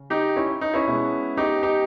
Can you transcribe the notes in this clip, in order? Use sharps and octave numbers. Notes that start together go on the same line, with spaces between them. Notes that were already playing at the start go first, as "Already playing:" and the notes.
Already playing: C#3
D#4 G4
C#4 E4
D#4
C#4 E4
B2 G#3 B3
D#4 G4
D#4 G4